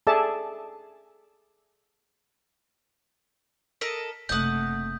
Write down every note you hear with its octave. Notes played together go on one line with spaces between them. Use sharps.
G#4 A4 D5 E5 A5
A4 A#4 D#5 B6
F#1 C3 A3 D#5 F#5 D#6 G6